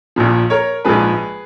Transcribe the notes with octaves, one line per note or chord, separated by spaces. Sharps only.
A#1 A#2 F3
A#4 C#5
A#1 G#2 F3 G#4 B4